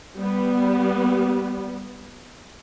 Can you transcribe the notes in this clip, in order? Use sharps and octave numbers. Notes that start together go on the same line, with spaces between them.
G3 B3